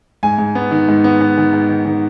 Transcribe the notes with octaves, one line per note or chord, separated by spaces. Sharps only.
G#2 G#5
G#2
B3
D#3
G#2
B3
B3
D#3
G#2
D#3
D#3